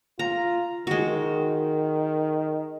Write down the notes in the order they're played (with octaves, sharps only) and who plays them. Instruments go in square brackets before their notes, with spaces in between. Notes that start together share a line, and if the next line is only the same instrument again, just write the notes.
[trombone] F4 [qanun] A#5
[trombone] D#3 [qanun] G#3 F#4